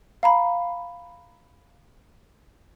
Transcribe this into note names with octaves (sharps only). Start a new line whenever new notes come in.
F5 A#5 B5